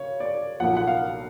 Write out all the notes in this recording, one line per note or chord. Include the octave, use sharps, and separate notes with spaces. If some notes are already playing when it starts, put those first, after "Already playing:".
Already playing: C#3 C#5
D5
B1 A#2 F3 F#5
F#5
F5